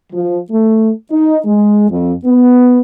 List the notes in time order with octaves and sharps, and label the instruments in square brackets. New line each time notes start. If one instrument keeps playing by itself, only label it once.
[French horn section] F3
A3
D#4
G#3
F2
B3